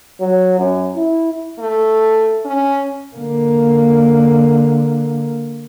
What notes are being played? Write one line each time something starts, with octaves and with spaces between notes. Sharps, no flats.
F#3
F#2
E4
A3
C#4
D3 A#3